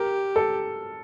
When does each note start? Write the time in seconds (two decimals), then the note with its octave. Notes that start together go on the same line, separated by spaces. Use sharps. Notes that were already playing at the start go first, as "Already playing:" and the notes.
Already playing: G4 A#4
0.36 A4